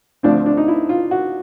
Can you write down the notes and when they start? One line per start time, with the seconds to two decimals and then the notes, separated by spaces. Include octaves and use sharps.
0.23 D2 D3 F3 A3 C4 D4
0.46 D4
0.57 D#4
0.68 E4
0.89 F4
1.11 F#4